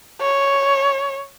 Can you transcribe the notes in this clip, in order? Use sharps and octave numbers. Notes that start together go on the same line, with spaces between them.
C#5